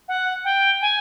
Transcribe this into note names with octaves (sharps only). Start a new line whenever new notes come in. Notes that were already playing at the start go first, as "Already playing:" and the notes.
F#5
G5
G#5